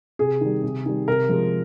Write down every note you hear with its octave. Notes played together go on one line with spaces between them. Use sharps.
C3 G#4
D#3 G3
C3
D#3 G3
C3 A#4
F3 G#3